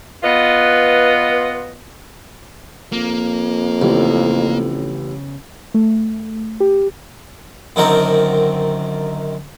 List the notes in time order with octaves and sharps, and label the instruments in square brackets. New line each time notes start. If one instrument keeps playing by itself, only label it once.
[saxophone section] B3 F4 B4 D#5
[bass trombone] F2 [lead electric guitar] A#3
[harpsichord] A1 [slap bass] C#3 B3
[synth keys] A3
G4
[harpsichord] F#2 D3 D#3 F#3 C4 A#4